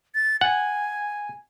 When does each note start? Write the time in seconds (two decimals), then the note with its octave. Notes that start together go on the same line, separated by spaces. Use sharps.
0.15 A6
0.41 F#5 G#5